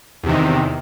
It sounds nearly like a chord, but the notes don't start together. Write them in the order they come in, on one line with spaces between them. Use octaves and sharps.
E2 C3 D#3